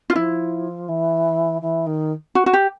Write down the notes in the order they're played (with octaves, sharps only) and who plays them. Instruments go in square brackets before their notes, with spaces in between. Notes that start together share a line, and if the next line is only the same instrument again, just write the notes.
[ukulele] F4
[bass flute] F3 [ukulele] E4
[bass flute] E3
E3
D#3
[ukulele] F#4
F#4
G4